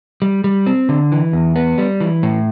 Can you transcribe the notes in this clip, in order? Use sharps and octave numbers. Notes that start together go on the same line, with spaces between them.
G3
G3
C4
D3
E3
E2
B3
G3
E3
A2